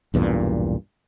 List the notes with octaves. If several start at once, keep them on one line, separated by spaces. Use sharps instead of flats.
B1 E2 G2 A#2